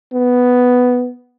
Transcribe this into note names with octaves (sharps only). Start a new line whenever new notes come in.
B3